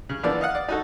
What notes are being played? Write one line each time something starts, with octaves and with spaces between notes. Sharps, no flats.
C#3
E3 F3 A#3 B3 D4 D5
D#5 F5 F#5
D5
D#4 F#4 A4